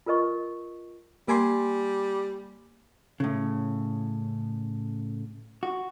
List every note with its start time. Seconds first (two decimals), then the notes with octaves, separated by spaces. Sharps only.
0.06 F4 A#4 B4 D#5 C#6
1.28 G3 A#3 G#5 C6
3.20 A2 C#3
5.63 F#4